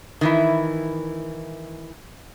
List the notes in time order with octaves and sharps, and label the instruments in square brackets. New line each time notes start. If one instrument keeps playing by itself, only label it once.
[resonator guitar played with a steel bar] D#3 E3 E4